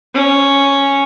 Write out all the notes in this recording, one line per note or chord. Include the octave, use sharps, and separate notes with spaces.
C#4